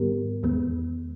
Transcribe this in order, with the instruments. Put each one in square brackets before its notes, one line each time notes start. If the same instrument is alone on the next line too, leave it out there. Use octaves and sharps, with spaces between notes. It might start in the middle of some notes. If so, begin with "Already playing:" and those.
Already playing: [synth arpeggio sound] G#2 D#3 G3 B3 G4 A#4
E2 D#3 G#3 B3